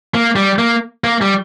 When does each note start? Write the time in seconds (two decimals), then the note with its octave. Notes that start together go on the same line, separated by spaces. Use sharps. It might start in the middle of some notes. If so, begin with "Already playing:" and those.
0.14 A#3
0.36 G3
0.59 A#3
1.04 A#3
1.21 G3